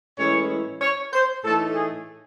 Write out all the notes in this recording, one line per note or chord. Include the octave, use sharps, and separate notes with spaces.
A2 E3 G#3 C#4 E4 C#5
C#5
C5
A2 E3 A3 D#4 A4
G#4